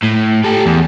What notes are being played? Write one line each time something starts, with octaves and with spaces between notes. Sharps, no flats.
A2
G4 A4
E2